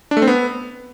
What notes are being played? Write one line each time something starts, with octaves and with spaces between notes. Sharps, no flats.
D4
A3
C4
B3